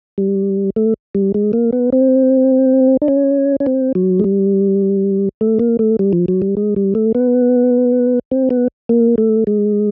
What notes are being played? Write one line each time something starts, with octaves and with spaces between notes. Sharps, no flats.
G3
A3
G3
G#3
A#3
B3
C4
D4
C#4
C#4
C4
F#3
G#3
G3
A3
A#3
A3
G3
F3
F#3
G3
G#3
G3
A3
B3
C4
B3
A#3
A3
G#3